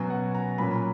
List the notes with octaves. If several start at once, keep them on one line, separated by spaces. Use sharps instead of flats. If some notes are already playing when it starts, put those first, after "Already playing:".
Already playing: B2 F#3 C#4 G#5
F#5
A#5
A#2 F#3 C#4 B5